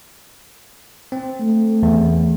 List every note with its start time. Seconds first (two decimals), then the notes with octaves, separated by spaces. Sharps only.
1.12 C4
1.40 A3
1.83 E2